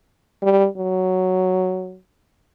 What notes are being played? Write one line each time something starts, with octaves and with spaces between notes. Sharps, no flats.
G3
F#3